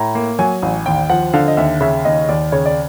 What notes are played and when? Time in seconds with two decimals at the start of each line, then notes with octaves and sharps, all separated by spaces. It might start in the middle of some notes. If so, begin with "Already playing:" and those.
Already playing: A2 A#5
0.15 A#3
0.39 F#3 G#5
0.62 A1
0.86 D#2 G5
1.10 F3 F#5
1.34 D3 F5
1.48 D#5
1.57 D#2 E5
1.81 C#3 E5
2.05 D#2 D#5
2.29 D#2 D5
2.52 C#3 C#5
2.66 D5